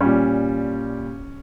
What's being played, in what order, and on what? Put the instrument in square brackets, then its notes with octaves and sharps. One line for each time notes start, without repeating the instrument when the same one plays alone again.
[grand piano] A#2 G3 C#4